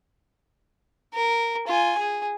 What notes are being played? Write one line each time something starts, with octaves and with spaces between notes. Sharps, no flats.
A#4
F4 G#5
G#4